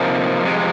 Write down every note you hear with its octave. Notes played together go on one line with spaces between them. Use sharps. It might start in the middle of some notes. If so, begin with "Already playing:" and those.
Already playing: C3 F3 A#3 D#4
F2 C3 G#3